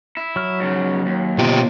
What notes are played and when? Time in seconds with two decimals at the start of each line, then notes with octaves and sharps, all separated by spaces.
0.17 E4
0.36 F#3 F6
0.60 G#2 C#3
1.06 D#2
1.38 B2 F4 G4